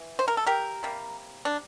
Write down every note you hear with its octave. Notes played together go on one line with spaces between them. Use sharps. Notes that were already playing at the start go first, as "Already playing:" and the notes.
Already playing: E3
C5
A#4
A4
G4 A#4
C3 G3 A#3
D4